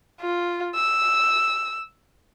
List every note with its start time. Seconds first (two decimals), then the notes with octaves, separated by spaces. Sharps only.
0.21 F4
0.75 E6